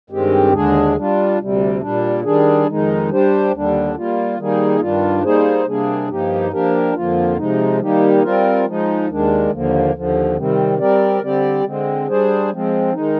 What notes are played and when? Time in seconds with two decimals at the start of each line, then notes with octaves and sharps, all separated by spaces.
0.10 G2 D#3 G#3 C4 G4
0.53 D#2 D3 G#3 D4 G#4
0.96 G3 D4 F4
1.38 D2 C3 G3
1.81 A#2 G3 D4
2.24 D#3 G3 D4 G#4
2.67 F2 D#3 G#3 D#4
3.09 G3 D4 G4 C5
3.52 D#2 D3 G3 D4
3.95 G3 A#3 F4
4.38 D#3 G3 A#3 D#4 G#4
4.80 G2 D#3 G3 D4 F4
5.24 G3 A#3 D#4 G#4 C5
5.66 C3 G3 A#3 D4 G#4
6.08 G2 F3 A#3 D#4 G4
6.52 F3 A#3 D4 G4 A#4
6.94 F2 D3 F3 A#3 F4
7.37 C3 F3 G#3 D#4
7.80 D#3 G3 A#3 D#4 G4
8.23 G3 C4 F4 A#4
8.66 F3 G#3 D#4
9.08 D#2 D#3 G#3 D4
9.51 D#2 D3 F3 A#3
9.94 D#2 D3 F3
10.36 C3 D#3 G3 C4
10.79 G3 C4 G4 A#4 D5
11.22 D3 G3 C4 G4 D5
11.64 D3 G#3 C4
12.07 G3 D4 G#4 C5
12.51 F3 G#3 C4
12.93 D#3 G#3 D#4